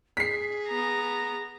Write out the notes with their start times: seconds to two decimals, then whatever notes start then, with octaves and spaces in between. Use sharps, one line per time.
0.17 G#4 B6 C7
0.68 B3 A#5